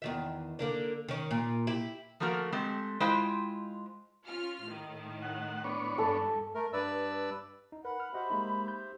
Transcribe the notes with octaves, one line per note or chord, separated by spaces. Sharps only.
E2 D#3 E5
D3 A#3 D4
D#3 C#4
A#2
E4 G4
F3 A3 A#3 F#4 A#4
G#3 A3 C4 G4
G#3 E4 F4 C5 G5
C#4 F4 F6
A2 D#3
F#5
B3 D4 C#5
G2 A4
A3 A#4
G2 B4 D5 E6
D#4
A#4 B4 F#5 B5
F6
F#4 G4 C5 D#5 E5 F#5
G#3 A#3 D#4
G6